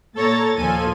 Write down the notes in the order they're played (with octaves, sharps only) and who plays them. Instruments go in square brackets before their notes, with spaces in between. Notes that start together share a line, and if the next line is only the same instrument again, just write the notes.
[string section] A#2 A6 [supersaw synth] A4 C#5 A#5
[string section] D#2 A#2 F3 [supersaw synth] A4 G#5 D#7